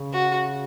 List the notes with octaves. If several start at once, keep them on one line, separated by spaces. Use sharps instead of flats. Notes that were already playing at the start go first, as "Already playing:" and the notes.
Already playing: C#3
F#4